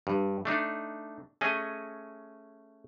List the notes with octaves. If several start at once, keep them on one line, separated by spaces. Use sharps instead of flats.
G2
A3 D4 D#4
A3 C#4 G#4 D#5